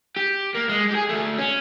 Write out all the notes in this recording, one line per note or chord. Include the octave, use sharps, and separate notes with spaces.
G4
A#3
G#3
G4 G#4
D2 A3
C#4